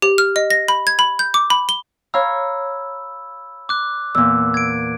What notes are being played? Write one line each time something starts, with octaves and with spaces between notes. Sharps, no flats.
G4
F6
D#5
A#6
B5
G#6
B5
G6
D6
B5
G7
C#5 F5 A#5 B5 E6
D6 F#6
E2 A#2 E6
G#6 D7